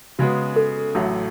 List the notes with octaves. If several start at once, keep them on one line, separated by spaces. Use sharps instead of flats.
C#3 G#3 B3 F#4
A4
A1 A2 F#3 A3